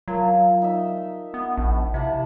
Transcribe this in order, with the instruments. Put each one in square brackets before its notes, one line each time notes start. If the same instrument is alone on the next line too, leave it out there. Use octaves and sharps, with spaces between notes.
[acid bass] F#3 [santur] F4 A#4 A5
[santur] D#4 E5
[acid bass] B3
A#1
[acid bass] C3 [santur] E4 F#5 A5